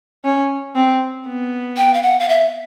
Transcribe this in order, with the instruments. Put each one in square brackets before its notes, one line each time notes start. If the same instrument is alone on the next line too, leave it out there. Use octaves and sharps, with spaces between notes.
[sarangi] C#4
C4
B3
[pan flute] G5
F5
F#5
F5
E5